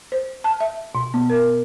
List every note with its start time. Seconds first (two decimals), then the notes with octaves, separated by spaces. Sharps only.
0.12 C5
0.44 A5
0.60 E5
0.95 B2
1.14 B3
1.30 A#4